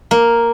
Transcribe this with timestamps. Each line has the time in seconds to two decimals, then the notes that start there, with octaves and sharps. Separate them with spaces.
0.11 A#3